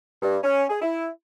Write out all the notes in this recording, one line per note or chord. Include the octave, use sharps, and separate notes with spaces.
G2
C#4
G#4
E4